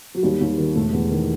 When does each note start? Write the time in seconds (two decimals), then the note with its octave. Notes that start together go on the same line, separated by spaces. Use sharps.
0.15 F#3
0.23 D#2 G3
0.40 D#2
0.58 D#3
0.75 E1 A3
0.93 E2
1.11 D#3